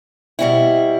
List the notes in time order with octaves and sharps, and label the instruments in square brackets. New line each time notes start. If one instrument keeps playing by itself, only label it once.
[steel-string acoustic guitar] B2 G3 C4 E4